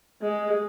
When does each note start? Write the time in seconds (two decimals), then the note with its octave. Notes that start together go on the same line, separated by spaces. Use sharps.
0.21 G#3